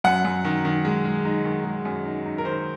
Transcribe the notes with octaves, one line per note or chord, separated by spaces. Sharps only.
F#2 F#5
F#2
D#3
D#3
G#3
G#3
D#4
D#3
G#3
F#2
D#4
D#4
A#4
D#3 C5